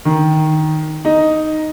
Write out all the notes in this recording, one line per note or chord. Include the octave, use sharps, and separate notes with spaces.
D#3
D#4